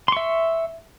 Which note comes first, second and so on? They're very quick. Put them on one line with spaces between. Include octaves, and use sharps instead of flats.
C6 C#6 E5